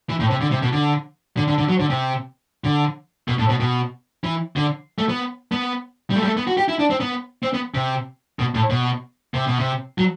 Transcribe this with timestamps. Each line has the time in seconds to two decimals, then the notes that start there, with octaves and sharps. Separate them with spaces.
0.09 E3
0.20 A2
0.30 C3
0.41 D3
0.52 C3
0.63 B2
0.73 D3
1.37 D3
1.48 D3
1.58 D3
1.69 F#3
1.80 D3
1.90 C3
2.64 D3
3.28 B2
3.38 A2
3.49 B2
3.60 B2
4.24 E3
4.56 D3
4.98 A3
5.09 B3
5.52 B3
6.10 G3
6.16 A3
6.22 G3
6.26 A3
6.37 B3
6.47 F#4
6.57 G4
6.68 E4
6.79 D4
6.90 C4
7.00 B3
7.43 C4
7.54 B3
7.75 C3
8.39 B2
8.55 A2
8.70 B2
9.34 C3
9.47 B2
9.59 C3
9.98 F#3